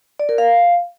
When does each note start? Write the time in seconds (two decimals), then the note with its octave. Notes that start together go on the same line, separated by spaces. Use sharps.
0.19 D5
0.29 A#4
0.38 F5